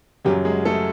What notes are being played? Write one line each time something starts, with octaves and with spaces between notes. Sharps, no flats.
F#2 C#3 F#3 G3 G4
G#3 G#4
A3 A4